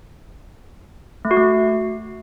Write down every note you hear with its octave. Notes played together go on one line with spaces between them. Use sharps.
A3
F#4
A3